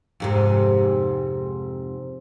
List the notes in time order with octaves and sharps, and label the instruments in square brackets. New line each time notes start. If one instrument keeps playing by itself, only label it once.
[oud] F2 G#2 C3